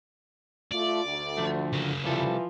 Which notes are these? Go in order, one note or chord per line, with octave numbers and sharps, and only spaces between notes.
A3 F4 D5
D2
D3 F3 A3
C#3 A#3
C2 E3 F3 G3 A4